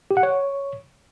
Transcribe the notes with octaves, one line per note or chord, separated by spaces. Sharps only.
G4
F#5
C#5